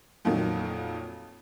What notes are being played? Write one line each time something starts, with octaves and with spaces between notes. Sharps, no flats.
F2 A#2 D#3 F#3